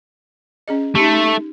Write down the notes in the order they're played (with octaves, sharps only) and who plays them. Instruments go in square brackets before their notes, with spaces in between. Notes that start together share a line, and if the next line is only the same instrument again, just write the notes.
[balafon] C#4 G#4 D#5
[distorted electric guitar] A3 [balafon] D#4 G4
[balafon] D#4